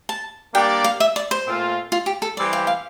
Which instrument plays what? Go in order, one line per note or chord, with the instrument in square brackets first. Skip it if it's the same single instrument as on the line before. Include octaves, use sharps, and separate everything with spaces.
[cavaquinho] A5
[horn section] G3 A#3 D4 G4 D5 [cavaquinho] G5
[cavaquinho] F5
E5
D5
C5
[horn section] A#2 A3 C4 F4
[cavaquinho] F4
G4
A4
[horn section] E3 G3 C4 G4 [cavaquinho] D5
[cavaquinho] F5
F5